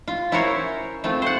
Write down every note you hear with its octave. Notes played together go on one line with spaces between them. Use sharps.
F4
C#4 E4 F#4 A#4 C5 C#5
A3 C4 F4
C5 F#5